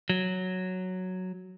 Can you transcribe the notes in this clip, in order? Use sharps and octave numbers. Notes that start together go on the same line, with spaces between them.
F#3